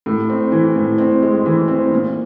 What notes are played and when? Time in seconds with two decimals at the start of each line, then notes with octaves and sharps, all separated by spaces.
0.06 A2
0.30 C4
0.52 E3
0.76 A2
0.98 C4
1.22 G#3
1.46 E3
1.68 C4
1.92 A#2